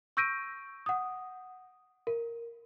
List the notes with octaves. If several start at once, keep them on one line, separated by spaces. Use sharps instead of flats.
C#6 E6 G6 A#6 D7 D#7
F#5 D#6
A#4